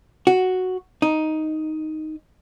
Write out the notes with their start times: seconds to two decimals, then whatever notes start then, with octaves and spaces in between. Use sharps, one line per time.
0.27 F#4
1.02 D#4